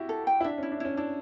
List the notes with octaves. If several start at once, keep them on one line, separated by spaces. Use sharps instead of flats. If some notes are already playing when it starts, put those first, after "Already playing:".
Already playing: E4 F#4 G4
A4
G5
E4
D4 E5
C#4 E4
D4
C#4 E4
D4 E4